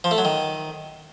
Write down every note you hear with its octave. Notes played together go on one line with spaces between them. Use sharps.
F3
A3
F#3
D#3